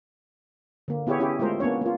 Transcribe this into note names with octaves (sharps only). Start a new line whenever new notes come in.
D3 A#3
B3 E4 G4 G#4 C#5
C#4 E4 G4 G#4
G#3 A3 F4 A#4 C5
A#3 B3 C#4 D4 C#5
A#3 F4